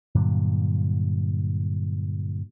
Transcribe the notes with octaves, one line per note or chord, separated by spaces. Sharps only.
G2 A#2 D3 F#3